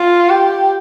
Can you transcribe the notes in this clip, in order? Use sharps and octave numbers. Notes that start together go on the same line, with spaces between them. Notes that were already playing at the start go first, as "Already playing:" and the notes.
Already playing: F4
G4